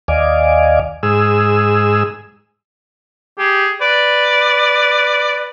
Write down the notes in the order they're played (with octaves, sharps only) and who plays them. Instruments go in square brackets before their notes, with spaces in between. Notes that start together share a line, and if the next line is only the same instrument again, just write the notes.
[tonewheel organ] D#2 D5 D#5 F5 G#5 D6
[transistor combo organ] G#2 G#4 E6
[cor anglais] G4 [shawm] G#4
[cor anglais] B4 [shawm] D5